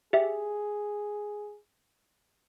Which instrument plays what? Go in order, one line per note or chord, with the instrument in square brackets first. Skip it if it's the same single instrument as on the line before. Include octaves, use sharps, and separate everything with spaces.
[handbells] G4 E5 [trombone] G#4